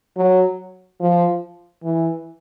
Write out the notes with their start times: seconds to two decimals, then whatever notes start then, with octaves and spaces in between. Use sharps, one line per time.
0.17 F#3
1.00 F3
1.83 E3